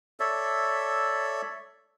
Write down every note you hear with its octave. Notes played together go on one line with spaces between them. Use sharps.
A4 C#5 D5 E5